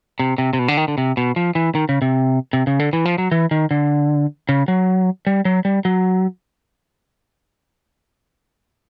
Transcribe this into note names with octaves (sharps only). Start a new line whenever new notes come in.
C3
C3
C3
B2
D3
D#3
D3
C3
B2
F3
E3
D#3
C#3
C3
C3
C#3
D3
E3
F3
F#3
E3
D#3
D3
C#3
F#3
G3
F#3
G3
F#3